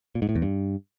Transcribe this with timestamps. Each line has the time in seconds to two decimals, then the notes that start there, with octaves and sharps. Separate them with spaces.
0.15 A#2
0.22 G#2
0.29 A2
0.35 E2
0.42 G2